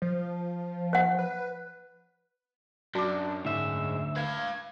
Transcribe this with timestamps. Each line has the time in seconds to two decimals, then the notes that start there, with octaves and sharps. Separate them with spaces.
0.02 F3
0.93 C#5 F#5
1.19 B4
2.95 F#2 D4 F#4 D6
3.45 D2 G#2 E5
4.16 B4 F5 G#6